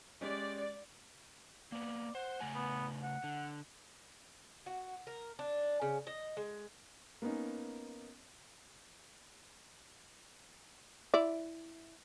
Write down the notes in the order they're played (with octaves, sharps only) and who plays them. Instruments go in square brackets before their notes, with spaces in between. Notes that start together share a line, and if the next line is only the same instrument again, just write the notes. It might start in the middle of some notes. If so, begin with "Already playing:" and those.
[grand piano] G#3 C#4 G4 [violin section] D5
[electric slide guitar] A#3 B3 [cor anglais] D5
[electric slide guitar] C5 [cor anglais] F#5
[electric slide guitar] C#3 A3 G#5
[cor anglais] B3
F#5
[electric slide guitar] D3
[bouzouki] F#4
A#4
D4
C#3
D#5
G#3
[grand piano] A#3 B3 C#4 D#4
[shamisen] E4 D5